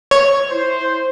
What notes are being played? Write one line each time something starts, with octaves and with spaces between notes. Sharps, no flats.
C#5
E4 C5